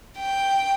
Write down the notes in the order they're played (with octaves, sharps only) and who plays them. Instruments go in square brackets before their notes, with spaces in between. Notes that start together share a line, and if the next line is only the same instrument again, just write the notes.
[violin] G5